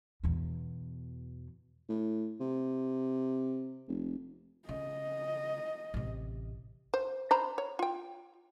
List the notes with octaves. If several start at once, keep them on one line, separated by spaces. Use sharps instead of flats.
E2 B2
A2
C3
F1
C#3 D#5
A1 C3
C5
C5 A#5 B5
C#5
F4 G5